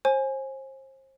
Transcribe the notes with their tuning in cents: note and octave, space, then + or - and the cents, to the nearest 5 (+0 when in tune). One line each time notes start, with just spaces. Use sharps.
C5 +35 G#5 +0